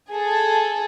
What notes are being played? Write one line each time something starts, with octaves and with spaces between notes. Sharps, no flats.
G#4 A4